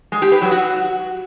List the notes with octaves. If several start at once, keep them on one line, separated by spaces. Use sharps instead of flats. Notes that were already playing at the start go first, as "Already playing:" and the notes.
G#3
G4
B4
F#3
F#4